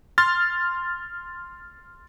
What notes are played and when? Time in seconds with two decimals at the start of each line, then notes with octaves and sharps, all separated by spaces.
0.18 C6 F6 A6